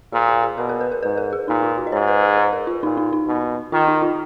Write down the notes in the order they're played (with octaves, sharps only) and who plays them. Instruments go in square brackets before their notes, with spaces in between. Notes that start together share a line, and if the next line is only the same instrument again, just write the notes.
[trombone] A#2 [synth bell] G#4
[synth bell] G#4
G#4
[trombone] B2 [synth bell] A#4
[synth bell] A#4
B4
A#4
[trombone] G#2 [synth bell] B4
[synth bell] A#4
G#4
[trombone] A#2 [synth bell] D#4
[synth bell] F4
F#4
D#5
[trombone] G#2 [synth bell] C#5
[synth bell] B4
G#4
G#4
A#4
F4
[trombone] A#2 [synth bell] D#4
[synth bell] D#4
D#4
[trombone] B2
[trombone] D#3 [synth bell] F4
[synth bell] D#4
F4